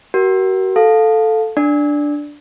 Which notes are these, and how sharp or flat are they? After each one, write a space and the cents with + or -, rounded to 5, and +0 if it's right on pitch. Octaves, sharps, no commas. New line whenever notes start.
F#4 +40 A#4 +20
A4 +0 F5 +15
D4 +0 D5 +0